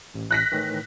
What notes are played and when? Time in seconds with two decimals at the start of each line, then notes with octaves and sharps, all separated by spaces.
0.14 A1
0.31 F#6 A#6 B6
0.52 A2 D#3 E3